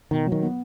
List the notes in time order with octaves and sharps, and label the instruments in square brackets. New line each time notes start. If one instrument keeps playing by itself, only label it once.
[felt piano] B2 [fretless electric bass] D#3
[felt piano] F#3
[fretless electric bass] D#3
[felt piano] B3